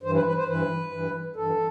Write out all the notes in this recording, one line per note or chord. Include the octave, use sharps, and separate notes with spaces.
G2 E3 C5
B4
B4
C5
G2 E3 B4
G2 E3
G2 E3 A4